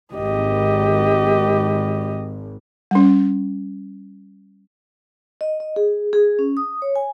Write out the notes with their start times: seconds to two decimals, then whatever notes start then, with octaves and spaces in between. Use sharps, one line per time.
0.14 G#1 G4 D#5
2.91 G3 C#4
5.41 D#5
5.60 D#5
5.76 G#4
6.13 G#4
6.39 C#4
6.57 D#6
6.82 C#5
6.96 G#5